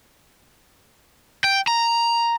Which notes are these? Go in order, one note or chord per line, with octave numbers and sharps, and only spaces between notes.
G5
A#5